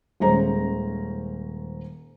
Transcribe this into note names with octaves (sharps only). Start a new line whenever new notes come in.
D#1 G#3 C#4 C5 A#5